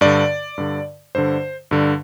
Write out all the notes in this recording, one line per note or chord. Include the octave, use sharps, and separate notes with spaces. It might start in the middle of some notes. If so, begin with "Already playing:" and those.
G2 D3 D5
G2 D3
G2 D3 C5
G2 D3